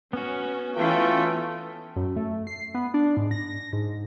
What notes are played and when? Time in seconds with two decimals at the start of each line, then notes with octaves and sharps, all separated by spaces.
0.13 B3 C#4 F#4
0.76 E3 A3 C#4 F4 G5
1.96 F#2
2.16 A3
2.47 C7
2.74 B3
2.94 D4
3.17 G#2
3.31 A#6
3.73 G#2